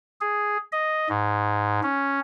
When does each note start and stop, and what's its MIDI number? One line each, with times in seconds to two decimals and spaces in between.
0.21 0.57 68
0.72 1.09 75
1.09 1.81 44
1.83 2.20 61